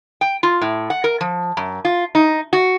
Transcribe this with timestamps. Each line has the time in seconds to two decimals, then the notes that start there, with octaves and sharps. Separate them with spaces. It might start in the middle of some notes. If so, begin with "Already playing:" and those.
0.21 G5
0.43 F4
0.62 A2
0.90 F#5
1.04 A#4
1.21 F3
1.57 F#2
1.85 F4
2.15 D#4
2.53 F#4